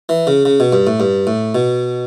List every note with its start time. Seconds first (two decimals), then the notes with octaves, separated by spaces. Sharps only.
0.09 E3
0.27 C#3
0.45 C#3
0.60 B2
0.72 G2
0.87 A2
1.00 G2
1.27 A2
1.55 B2